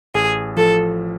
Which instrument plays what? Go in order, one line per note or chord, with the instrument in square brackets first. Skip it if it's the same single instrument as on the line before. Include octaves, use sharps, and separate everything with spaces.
[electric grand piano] A1 [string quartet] G#4
[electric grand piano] F3 [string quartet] A4